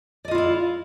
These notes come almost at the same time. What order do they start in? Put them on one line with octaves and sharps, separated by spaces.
D5 D#5 F4 E4 F5